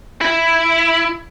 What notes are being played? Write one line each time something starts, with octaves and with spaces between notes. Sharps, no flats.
E4